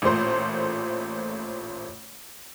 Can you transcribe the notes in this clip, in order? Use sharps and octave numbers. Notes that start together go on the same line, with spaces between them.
A1 A#2 A3 C5 C6